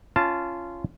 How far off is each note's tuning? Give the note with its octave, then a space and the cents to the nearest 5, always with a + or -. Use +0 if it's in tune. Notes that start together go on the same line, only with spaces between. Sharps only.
C#4 +0 F4 -20 A5 +0